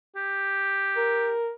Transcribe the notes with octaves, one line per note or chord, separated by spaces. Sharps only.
G4
A#4